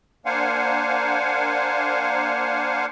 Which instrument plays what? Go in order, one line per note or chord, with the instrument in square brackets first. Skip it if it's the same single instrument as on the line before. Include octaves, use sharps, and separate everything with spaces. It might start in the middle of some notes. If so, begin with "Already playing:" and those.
[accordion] A#3 D4 C5 F5 F#5 G#5